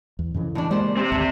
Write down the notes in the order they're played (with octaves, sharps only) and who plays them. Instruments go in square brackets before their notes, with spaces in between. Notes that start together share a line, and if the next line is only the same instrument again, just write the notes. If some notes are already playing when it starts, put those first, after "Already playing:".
[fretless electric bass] E2
F2 C#3 E3
[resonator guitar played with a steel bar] A2 G#3 D4 [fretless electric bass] E3
[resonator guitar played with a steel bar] G3 C5 D5 [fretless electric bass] G#3 A#3
[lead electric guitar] C3 C4
[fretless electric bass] G#1 D2 [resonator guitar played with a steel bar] A3